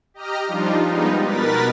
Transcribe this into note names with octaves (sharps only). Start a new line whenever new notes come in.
G4 D#5 A#5 F6
F3 G3 D4 D#4 F4
G3 G#3 B3 D#4
B2 A#4 B4 A6 B6